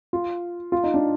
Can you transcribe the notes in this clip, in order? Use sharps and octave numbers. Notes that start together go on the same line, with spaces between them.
F4
F4
D#4
D4